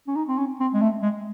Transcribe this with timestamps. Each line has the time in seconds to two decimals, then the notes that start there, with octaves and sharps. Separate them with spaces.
0.08 C#4
0.16 D#4
0.28 C4
0.38 C#4
0.60 C4
0.74 G#3
0.82 A3
1.02 G#3